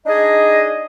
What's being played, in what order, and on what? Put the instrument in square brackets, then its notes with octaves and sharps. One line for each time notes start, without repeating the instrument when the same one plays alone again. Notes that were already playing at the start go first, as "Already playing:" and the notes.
[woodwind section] D4 D#4 G#4 D#5